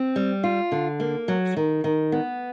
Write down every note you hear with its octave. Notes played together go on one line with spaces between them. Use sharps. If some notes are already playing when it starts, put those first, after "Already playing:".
Already playing: C4
G3
F4
D3
A#3
F#3
D#3
D#3
B3